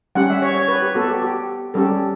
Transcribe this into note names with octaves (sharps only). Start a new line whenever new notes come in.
G3 C#4 G4 F#5
E5
C#5
C#5
B4
G4
B3 F#4 A4
G4
G4
G3 C#4 G4 A4